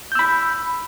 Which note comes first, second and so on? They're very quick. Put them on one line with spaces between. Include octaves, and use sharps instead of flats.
G6 E6 B5